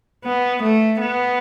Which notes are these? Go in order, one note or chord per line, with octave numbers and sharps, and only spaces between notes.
B3
A3
B3